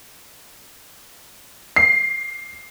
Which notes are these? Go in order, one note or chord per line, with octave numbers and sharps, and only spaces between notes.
C7